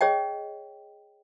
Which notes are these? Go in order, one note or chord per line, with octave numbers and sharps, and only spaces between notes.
G#4 C#5 D#5 G5